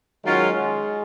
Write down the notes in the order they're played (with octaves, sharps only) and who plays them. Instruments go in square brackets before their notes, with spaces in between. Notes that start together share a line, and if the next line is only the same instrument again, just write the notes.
[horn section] D#3 F#3 C#4 F4 [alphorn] G#3